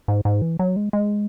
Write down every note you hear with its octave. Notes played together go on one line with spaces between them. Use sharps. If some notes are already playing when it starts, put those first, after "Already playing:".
G#2
G#2
E3
F#3
G#3
G#3